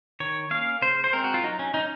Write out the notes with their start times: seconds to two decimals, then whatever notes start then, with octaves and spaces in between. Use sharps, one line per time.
0.20 D#3 C#5
0.51 A#3 C#4 F5
0.82 C#3 C5
1.04 C5
1.13 G#3 C4 A#4
1.24 F#4
1.34 F4
1.44 F#3 D#4
1.59 C#4
1.74 C#4 D#4